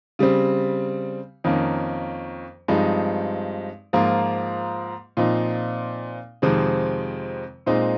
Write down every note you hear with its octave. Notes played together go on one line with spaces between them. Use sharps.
C#3 G3 C4
F2 D#3 A#3 C#4
G2 F3 G#3 C4 D#4
G#2 F3 A#3 F4
A#2 F3 C4 D#4
F2 C3 D#3 G#3 C4
A#2 G#3 C4 D#4